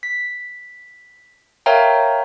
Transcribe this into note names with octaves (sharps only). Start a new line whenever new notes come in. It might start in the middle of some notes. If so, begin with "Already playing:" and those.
B6
A#4 C#5 E5 F5 G5 A#5